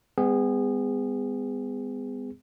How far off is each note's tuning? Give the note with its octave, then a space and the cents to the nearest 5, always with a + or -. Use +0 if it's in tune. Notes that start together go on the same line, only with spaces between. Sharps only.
G#3 -40 B3 +35 G#4 -25